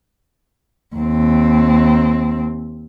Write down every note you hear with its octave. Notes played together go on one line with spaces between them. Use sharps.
D#2 C4